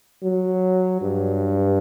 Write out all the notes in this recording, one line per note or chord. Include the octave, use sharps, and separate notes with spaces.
F#3
G2